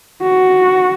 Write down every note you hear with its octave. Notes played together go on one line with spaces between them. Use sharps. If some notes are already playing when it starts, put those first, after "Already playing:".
F#4